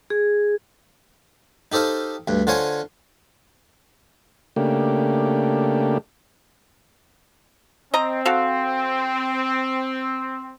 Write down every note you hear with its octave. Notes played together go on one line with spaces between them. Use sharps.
G#4
D#4 G4 A4 C5 F5
D2 G2
D3 F4 C5 C#5 G#5 C6
C#3 A3 A#3 D4 G4
C4 D#5 A#5
F#4 A4 F5